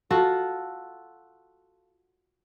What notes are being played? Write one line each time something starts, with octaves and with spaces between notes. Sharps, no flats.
F4 F#4 A4